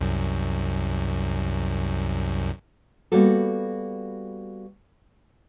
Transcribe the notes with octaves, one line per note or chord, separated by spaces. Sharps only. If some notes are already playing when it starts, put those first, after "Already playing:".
C2 F#2
G3 A#3 B3 F#4 A4